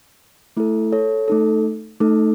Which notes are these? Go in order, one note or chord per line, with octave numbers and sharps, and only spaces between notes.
A3 E4 A4
A4 C#5
A3 D#4 A4
A3 D#4 A4